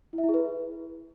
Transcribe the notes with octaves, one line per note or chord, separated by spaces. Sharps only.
E4
E5
E4
G#4
B4